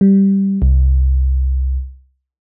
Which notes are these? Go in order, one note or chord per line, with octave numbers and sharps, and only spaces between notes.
G3
C2